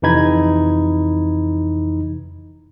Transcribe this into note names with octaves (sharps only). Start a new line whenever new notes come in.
F2 C3 E3 D#4 B5 G#6